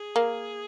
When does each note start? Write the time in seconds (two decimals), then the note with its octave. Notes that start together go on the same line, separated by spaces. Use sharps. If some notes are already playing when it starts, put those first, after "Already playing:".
Already playing: G#4
0.16 A#3